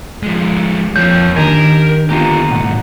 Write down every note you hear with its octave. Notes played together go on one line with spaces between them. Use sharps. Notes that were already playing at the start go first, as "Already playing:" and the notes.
F3 G#3
F2 F3 A#3 C#5 G6
D#3 D4 G4 A#4 G#5
D3 A#3 B3 F4 G4 A#5
B1 G#2 F#5